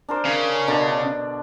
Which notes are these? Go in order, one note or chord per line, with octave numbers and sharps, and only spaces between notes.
D4 A#4 C5
C#3
B2 D3 D4